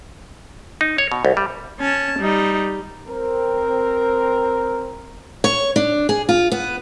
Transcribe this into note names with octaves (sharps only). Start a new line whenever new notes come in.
D#4
C#5
B2
C2
G3
C#4 A5
G3 D#4
C4 A#4
C#5
D4
G#4
F4
B3